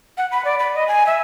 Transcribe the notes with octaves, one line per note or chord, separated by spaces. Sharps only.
F#5
B5
D5
B5
D#5
G#5
E5